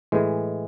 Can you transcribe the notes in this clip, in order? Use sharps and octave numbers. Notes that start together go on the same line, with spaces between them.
A2 E3 G#3